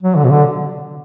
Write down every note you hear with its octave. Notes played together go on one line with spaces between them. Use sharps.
F#3
D3
B2
D3